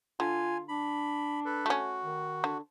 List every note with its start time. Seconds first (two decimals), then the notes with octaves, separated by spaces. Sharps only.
0.20 D3 F4 G#5
0.68 D4 B5
1.45 A4 B4
1.66 A3 C#4 F#4
2.03 D#3
2.44 D3